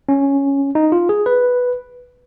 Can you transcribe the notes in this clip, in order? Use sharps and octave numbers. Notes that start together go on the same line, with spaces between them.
C#4
D#4
F4
G#4
B4